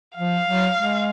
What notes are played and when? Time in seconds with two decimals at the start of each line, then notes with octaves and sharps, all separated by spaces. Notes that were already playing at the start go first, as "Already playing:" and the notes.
0.16 F3 F5
0.46 F#3
0.76 G#3